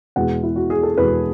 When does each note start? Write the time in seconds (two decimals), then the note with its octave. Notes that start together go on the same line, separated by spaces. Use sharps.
0.16 E2 B2 G#3 F#5
0.43 E4
0.56 F#4
0.70 G#4
0.83 A4
0.98 E2 B2 G#3 B4